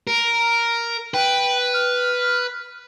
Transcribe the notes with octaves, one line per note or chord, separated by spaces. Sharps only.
A#4
B4 G5
F6